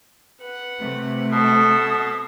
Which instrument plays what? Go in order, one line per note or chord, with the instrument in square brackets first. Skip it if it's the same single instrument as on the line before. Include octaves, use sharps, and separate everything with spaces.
[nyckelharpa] B4 F#5
[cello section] C3 A3
[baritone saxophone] B2 [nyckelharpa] A4 [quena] D#6